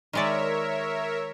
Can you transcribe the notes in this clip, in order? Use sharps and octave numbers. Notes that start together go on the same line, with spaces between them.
D#3 G#3 A#4 C#5 D5 E5